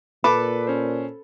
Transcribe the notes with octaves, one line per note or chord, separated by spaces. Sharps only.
A#2 A4 B4 A5 B5 D6
C#4 C5